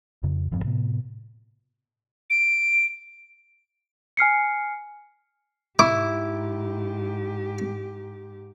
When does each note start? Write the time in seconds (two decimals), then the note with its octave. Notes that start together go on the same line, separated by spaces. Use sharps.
0.23 F2 C#3
0.51 E1 G2 F3 C4
0.64 A2 C3 B3
2.30 D7
4.17 G#5 F6 C7 C#7
5.79 G#2 E4 G4 D6